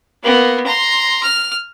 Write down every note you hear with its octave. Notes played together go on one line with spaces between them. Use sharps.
A#3 B3
A#5 C6
F6